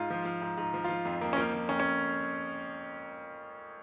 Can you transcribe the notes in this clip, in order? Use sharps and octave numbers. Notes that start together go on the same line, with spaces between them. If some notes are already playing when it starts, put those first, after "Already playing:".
Already playing: G#2 F4
F3
F3
G#2
G#2
F3
F4
F3
F2
F2 A#3
C#4
F3 A#3
F3
F2 C#4
C#4